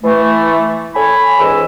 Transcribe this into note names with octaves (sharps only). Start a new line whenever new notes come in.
E3 A3
A4 C#5 G#5 B5
C#2 G#2 C#3 E3 D#5 E6